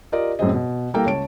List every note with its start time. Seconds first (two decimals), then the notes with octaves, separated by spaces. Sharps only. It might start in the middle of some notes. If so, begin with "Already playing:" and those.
0.12 F4 G4 A#4 D5 D#5
0.39 F#2 A2 F#3 C4 G#4 D#5
0.53 B2
0.94 G3 A#3 E4 A4 A#4 G5
1.05 C#2 C#5 A5 D7